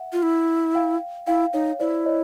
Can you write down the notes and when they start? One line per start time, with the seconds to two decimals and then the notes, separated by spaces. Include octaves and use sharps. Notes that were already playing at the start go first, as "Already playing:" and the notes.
Already playing: E5 F#5
0.13 F4
0.23 E4
0.75 F5 G5
1.27 E4 F5 G5
1.53 D#4 C#5
1.79 E4 C5 D5
2.06 C#5 D#5